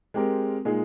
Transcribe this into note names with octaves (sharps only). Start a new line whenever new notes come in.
G#3 C4 G4 A#4
A#2 G#3 D#4 G#4